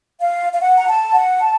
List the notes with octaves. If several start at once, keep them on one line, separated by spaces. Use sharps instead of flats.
F5
F5
F#5
A#5
A5
F#5
A5